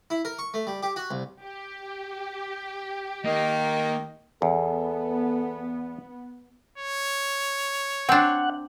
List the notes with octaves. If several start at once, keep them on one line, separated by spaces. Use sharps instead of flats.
E4
A#4
C#6
A3
G3
G4
F#4
C2
G4
D#3 A#3 D#5
E2 B3 A4
C#5
C4 D4 F#5